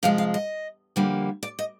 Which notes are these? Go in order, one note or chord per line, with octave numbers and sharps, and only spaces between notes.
C3 F3 G#3 F5
F5
D#5
F2 D3 G3 A#3
D5
D#5